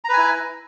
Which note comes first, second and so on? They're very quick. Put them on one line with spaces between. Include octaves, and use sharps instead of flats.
A#5 B4 G#5 E4